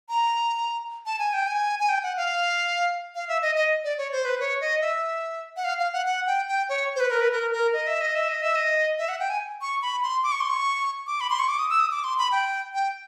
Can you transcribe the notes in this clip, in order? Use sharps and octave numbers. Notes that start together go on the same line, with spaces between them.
A#5
A5
G#5
G5
G#5
G#5
G5
F#5
F5
F5
E5
D#5
D#5
D5
C#5
C5
B4
C#5
D#5
E5
F#5
F5
F5
F#5
F#5
G5
G5
C#5
C5
B4
A#4
B4
A#4
A#4
D#5
E5
D#5
E5
D#5
E5
D#5
E5
F#5
G5
G#5
C#6
B5
C6
D6
C#6
C6
C#6
D6
B5
C6
C#6
D6
D#6
E6
D#6
D6
C6
B5
G5
G5